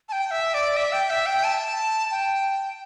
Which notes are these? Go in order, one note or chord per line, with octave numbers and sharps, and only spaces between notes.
A5
G5
E5
D5
E5
G5
E5
G5
A5
G5